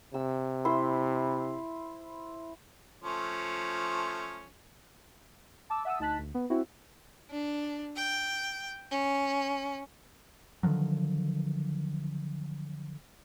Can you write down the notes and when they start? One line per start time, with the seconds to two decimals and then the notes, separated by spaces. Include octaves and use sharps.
0.14 C3 E6
0.65 E4 C5 C6
3.04 F3 A3 C#4
5.70 A5 D6 E6
5.85 E5 F#5 A5 D#6 E6
5.99 D2 D#4 A5 F#6 B6
6.18 D2
6.35 B3
6.50 C4 E4 F#4
7.29 D4
7.96 G5
8.90 C#4
10.63 D3 D#3 F3 F#3